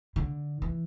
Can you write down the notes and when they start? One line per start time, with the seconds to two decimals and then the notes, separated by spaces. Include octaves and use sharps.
0.16 D3
0.62 E3